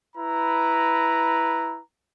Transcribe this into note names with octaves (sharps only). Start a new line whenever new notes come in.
E4 B4 A#5